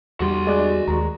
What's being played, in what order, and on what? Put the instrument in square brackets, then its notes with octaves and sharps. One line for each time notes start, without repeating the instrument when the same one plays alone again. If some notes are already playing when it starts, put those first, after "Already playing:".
[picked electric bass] E2 G3 [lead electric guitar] F#4 C6
[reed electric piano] G#3 D5 F#6
[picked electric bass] D#2 G#3 [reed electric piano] A#5